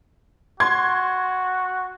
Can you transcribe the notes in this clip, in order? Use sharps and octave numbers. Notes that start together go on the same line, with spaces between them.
F#4 C6 G#6